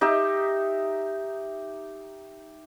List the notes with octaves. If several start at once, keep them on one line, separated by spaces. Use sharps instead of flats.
D#4 G4 E5